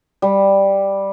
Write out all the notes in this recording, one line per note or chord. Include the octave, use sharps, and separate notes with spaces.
G3